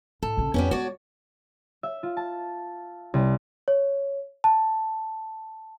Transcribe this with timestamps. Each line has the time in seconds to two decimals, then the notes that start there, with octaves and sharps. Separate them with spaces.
0.23 A2 A4
0.37 A#1 C#3
0.54 F2 G3 B3 C#4
0.71 G#3 F#4 C#5 D5
1.83 E5
2.03 F4
2.17 A5
3.14 C2
3.68 C#5
4.44 A5